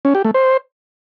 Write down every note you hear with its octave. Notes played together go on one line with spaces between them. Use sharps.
C#4
G4
A3
C5